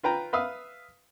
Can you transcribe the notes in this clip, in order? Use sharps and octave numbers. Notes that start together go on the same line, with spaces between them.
F4 B4 G5 A#5
B4 E5 F5 D#6